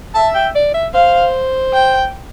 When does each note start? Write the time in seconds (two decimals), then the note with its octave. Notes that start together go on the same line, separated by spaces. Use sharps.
0.14 E5 A5
0.35 G5
0.55 D5
0.74 E5
0.94 C5 F5
1.73 G5